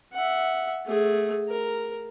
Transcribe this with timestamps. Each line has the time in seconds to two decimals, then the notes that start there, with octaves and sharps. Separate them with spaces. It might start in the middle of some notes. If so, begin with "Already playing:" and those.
0.13 E5 F#5
0.87 A3 G#4
1.48 A#4